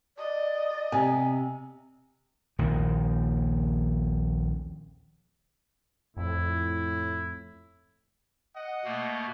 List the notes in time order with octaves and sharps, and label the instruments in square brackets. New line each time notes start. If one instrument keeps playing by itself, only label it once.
[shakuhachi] D5 [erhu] D#5
[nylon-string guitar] C3 [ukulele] G#5
[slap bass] A#1 D#2 D#3
[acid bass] F2 [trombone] A2 [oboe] E4
[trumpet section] D#5 F#5
[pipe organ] B2 A3 A#3